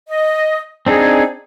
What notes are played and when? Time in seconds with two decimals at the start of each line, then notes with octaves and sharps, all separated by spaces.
0.08 D#5
0.86 C4 D4 D#4 G#4